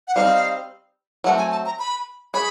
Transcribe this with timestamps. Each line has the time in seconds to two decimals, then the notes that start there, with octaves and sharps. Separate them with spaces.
0.08 F#5
0.15 G3 C4 D#4 F5
1.24 F#3 A3 C4 F#5
1.38 G#5
1.52 A5
1.66 A#5
1.79 B5
2.34 G#4 C#5 B5